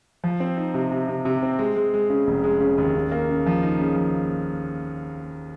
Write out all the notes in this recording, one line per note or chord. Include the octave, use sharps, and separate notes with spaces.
F3
C4
D#4
C3
C3
C3
C3
C4
G#3
G#3
G#3
C#3
F1
G#3
C#3
D#2
C#3
A#3
C#3
F3
D#4
C#3
F3